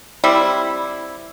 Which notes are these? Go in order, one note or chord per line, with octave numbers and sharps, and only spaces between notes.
G3 C4 E4